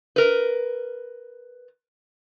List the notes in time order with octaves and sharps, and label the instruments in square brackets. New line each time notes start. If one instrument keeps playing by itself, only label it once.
[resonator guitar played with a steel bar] A#4 B4